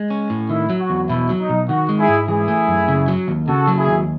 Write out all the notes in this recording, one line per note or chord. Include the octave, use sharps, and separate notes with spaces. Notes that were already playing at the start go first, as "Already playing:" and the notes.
Already playing: G#3
C#4
A2
D#3 E4
F#3
F#4
E2
B2 E4
F#3
D#4
B1
D#3 F#4
G#3
E4 G#4
G#2
E3 E4 G#4
A3
F#2
C#3
F#3
D#2
C#3 F#4 A4
F#3
E4 G#4
D#2